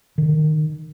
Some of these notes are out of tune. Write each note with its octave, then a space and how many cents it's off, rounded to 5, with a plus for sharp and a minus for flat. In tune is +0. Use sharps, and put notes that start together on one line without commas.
D#3 -20